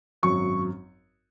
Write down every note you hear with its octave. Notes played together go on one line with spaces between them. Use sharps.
G#1 F#2 F#3 C#6